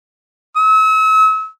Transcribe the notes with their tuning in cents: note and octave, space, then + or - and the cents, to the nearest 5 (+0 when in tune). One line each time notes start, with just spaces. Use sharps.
E6 -40